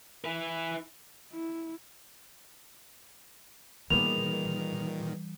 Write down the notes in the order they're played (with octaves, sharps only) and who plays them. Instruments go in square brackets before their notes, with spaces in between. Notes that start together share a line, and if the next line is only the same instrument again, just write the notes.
[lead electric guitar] E4 B4
[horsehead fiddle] E4
[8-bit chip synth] A#2 D#3 [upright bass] E3 G3 [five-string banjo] A#3 B3 G#4 [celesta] F7